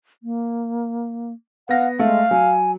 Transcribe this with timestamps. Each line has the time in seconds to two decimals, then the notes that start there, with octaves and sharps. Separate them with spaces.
0.23 A#3
1.69 B3 F5 F#5 A#6
1.99 G#3 A3 F5
2.31 F#3 G#5